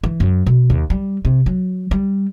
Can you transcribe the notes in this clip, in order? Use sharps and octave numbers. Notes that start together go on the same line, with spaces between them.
E3
F#2
B2
D#2
G3
C3
F#3
G3